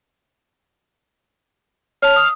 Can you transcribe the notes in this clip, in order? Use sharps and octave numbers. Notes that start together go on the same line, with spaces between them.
C#5 A5 F6
D#6